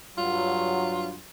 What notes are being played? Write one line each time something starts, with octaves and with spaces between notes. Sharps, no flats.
G2 F#3 F4